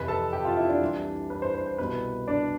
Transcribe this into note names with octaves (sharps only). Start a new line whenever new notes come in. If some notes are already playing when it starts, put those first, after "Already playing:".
Already playing: F2 C3 E3 B4 B5
A4 A5
G4 G5
F4 F5
E4 E5
D4 D5
C2 C3 E3
B4
C5
C5
C5
C2 B2 B4
D4 D5